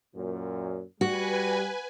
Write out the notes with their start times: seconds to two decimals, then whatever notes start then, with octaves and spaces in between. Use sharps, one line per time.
0.15 F#2 A#2
1.01 G3 F#4 B4 G#5